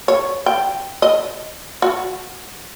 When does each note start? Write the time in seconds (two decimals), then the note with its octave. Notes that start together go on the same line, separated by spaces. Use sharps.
0.08 C#5
0.46 G5
1.02 D#5
1.82 F#4